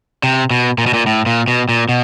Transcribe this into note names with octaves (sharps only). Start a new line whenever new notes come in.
C3
B2
A#2
B2
A#2
A2
A#2
B2
A#2
B2